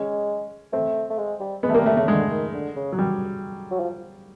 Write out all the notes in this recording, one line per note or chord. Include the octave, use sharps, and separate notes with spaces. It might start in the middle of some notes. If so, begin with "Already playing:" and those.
Already playing: G#3 C#4
A3 C4
A3
G#3
G3
G#3 B3
A3
G3 A#3
G3 A3
C#3 A3
D3 G#3
D#3
D3
C#3
F#3
G3
F#3
F3